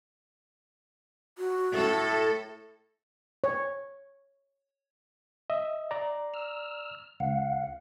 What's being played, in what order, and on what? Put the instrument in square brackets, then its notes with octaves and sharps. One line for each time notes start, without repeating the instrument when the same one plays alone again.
[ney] F#4
[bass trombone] A2 [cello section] A4
[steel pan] C#5
[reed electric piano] D#5 E5
D5 A#5
[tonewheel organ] E6 F6
[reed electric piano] C#2 [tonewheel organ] F5 F#5